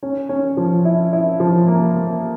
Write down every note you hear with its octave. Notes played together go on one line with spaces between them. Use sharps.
C#4
C#4
F3
E4
E4
F3
A#3
A#3